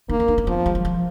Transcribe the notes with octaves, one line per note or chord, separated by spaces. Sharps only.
A#3 D#4
C#4
D#4
C#4
F3 B3
G#3
F#3
F3